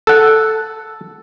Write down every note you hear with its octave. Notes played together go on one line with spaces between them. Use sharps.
A4 F#5